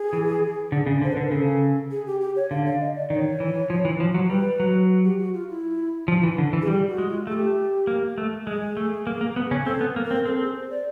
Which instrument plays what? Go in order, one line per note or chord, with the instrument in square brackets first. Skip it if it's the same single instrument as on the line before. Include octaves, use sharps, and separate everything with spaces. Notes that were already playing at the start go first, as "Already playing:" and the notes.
Already playing: [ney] G#4
[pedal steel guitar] E3
D3
C#3
[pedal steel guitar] D3 [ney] C5
[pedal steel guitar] D3 [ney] B4
[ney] A#4
[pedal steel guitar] C#3 [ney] A4
[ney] G#4
G4
G4
C#5
[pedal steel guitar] D3 [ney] F5
[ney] F5
D#5
D5
[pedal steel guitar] D#3 [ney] D5
[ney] C#5
[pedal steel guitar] E3
F3
E3
F3
F#3
[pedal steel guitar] G3 [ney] B4
[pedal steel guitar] F#3
[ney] G4
F#4
F4
E4
[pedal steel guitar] F3 [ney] F4
[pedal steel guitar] E3
D3
E3
[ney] G#4
[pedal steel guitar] G3 [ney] G4
[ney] F#4
[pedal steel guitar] G#3
[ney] F4
[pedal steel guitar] A3 [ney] G#4
[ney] G4
[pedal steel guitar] A#3
A3
[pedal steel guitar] G#3 [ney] G#4
[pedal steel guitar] A3
A#3
A#3
B3
C#3 C#4
[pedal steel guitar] C4 [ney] A4
[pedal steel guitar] B3
A#3
[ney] A#4
[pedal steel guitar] C4
[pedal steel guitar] C4 [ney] A4
[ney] G#4
C5
D5